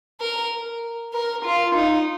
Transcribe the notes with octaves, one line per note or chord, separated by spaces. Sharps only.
A#4
A#4
F4
D#4